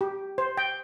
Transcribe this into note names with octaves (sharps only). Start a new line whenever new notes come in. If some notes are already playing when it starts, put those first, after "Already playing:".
G4
C5
G5